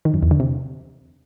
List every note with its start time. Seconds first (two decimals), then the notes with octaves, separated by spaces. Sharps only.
0.05 D#3
0.14 F#2
0.23 E2
0.31 D3
0.40 C3